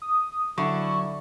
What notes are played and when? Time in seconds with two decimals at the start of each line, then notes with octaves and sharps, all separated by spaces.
0.02 D#6
0.58 D3 F#3 E4 C#6